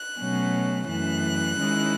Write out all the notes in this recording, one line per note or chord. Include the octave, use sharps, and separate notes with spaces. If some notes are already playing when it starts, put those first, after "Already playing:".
Already playing: F#6
B2 F#3 A3 C#4
F#2 E3 A3 F#6
D#3 G#3 C#4 E4